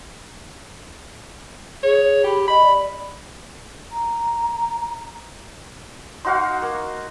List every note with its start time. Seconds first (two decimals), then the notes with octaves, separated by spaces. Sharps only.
1.83 G#4 C#5
2.24 G4 B5
2.48 D#5 B5
2.63 D5
3.92 A#5
6.25 D#4 F#4 F5 F#5 C6
6.62 A#3